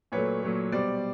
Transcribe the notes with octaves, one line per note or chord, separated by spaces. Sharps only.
A#2 F#3 A3 B4 C#5
A#2 F#3 A3
B2 G3 C5 D5